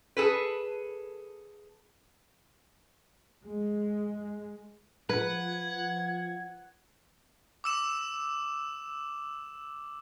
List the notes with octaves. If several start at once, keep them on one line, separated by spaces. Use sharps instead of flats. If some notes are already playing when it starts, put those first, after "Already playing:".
G#4 A4 B4
G#3
F3 B4 F#5 G#6
D6 E6 E7